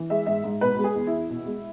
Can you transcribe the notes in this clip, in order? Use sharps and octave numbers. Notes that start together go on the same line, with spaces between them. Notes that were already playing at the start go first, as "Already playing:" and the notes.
Already playing: E3
G#3 E5
G#2 E5
G#2
B2 B4
G#3
G#4
E2
E4
E2
B2
G#3